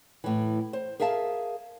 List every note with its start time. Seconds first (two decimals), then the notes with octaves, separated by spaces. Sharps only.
0.24 A2 E3
0.73 C5
1.00 G#4 A#4 E5 F5 A5